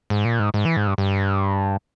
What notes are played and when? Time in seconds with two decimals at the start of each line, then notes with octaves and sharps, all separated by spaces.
0.10 G#2
0.25 A#2
0.39 G#2
0.54 G#2
0.65 E3
0.77 G#2
0.87 G2
0.98 G2